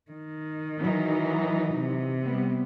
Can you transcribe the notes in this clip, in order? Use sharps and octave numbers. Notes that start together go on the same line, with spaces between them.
D#3
E3 F#3 D#4
C3
G3 B3